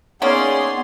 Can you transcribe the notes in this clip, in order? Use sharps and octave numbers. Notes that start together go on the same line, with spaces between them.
A#3 B3 C#4 D#4 G#4 D5 C6